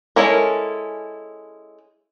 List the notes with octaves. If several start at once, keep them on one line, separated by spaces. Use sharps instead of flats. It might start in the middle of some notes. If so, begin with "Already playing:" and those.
G#3 C#4 E4 A4 A#4